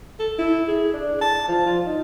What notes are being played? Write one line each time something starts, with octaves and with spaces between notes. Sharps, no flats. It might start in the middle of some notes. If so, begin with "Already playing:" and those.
A4
E4
G#4
D4
A5
F3
F4
D#4